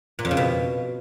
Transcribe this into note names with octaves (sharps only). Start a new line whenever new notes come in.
A#2
F2
C#3
B2